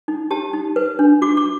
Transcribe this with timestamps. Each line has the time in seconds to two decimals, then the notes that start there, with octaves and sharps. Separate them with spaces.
0.08 D#4
0.31 G4 A5
0.53 D#4
0.76 B4
0.99 D4
1.22 F#4 D6
1.37 D6